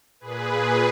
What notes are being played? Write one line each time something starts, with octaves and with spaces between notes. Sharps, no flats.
A#2 G#4 B4